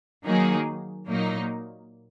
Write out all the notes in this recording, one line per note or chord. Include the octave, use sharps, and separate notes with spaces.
D#3 F#3 A#3 D#4 G#4
A#2 F#3 A#3 D#4